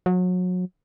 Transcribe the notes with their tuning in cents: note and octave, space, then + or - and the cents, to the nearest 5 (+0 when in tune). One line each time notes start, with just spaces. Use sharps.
F#3 -30